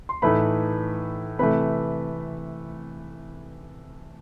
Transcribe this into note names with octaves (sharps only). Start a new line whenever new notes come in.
C6
A2 E3 A3 D#4 B4 B5
C3 E3 A3 B4 B5